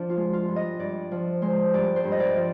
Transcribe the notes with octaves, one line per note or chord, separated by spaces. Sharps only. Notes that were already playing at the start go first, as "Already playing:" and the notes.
Already playing: F3 D4
F4
G#3
F4
G2
D#5
G2 D5
F3
G#3 C5
G2 D5
C5
G2
D#5
D5
F3